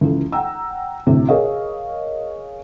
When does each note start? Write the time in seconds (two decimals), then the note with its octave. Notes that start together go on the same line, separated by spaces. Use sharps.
0.01 C#2 E3 A4
0.32 F#5 G5 A#5 E6
1.07 D2 A2 C3
1.28 G#4 A#4 C#5 D#5 F5